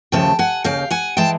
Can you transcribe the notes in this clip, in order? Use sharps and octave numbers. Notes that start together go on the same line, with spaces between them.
D#2 C#3 F3 A3 G5 A5
F#5 G#5
D#2 C#3 F5 G5
F#5 G#5
E3 G#3 G5 A5